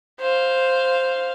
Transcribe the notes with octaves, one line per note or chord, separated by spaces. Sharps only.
C5 F5